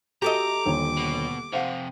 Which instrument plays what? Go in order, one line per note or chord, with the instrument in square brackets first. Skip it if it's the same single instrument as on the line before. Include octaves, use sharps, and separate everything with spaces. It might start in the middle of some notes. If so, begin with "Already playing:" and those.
[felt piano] F#4 [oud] G4 A4 D#5 [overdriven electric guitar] A#5 [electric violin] D6
[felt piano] D#1 D3 C#5
[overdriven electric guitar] B2
[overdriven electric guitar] F2 C3 [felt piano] C5 F5 F#5